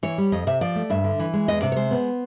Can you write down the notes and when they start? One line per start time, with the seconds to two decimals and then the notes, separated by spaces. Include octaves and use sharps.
0.03 E3 C#5
0.18 G3
0.32 F2 D#5
0.47 C3 E5
0.61 F3 D5
0.76 A3
0.90 G2 E5
1.04 D3
1.19 E3
1.33 G#3
1.48 E2 D#5
1.62 C3 D5
1.72 C#5
1.76 G#3 C5
1.91 B3